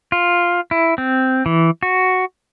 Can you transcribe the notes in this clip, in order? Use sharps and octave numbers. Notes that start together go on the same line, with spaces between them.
F4
E4
C4
E3
F#4